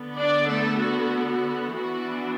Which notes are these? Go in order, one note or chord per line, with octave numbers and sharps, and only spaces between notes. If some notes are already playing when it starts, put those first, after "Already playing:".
Already playing: D3 B3
D4 D5
A3 A4
F#4
F#4
E3 B3 D4 F#4